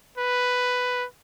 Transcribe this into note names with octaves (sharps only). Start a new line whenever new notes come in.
B4